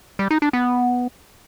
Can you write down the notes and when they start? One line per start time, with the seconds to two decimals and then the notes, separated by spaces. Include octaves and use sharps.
0.19 G3
0.31 D#4
0.42 D4
0.53 B3